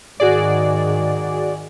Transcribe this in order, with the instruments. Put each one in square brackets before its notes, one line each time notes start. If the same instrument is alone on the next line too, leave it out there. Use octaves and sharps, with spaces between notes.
[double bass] G#2 D#3 [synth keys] F#4 G#4 D5